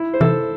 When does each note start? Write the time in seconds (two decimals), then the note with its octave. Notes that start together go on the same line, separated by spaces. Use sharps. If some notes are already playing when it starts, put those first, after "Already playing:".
Already playing: E4
0.14 C5
0.21 C3 E3 A4